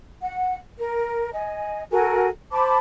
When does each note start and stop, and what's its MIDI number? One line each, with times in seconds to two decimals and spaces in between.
0.22 0.57 78
0.79 1.30 70
1.33 1.84 75
1.33 1.84 80
1.91 2.28 66
1.91 2.28 69
1.91 2.28 70
1.91 2.28 80
2.52 2.79 72
2.52 2.79 81
2.52 2.79 83
2.52 2.79 86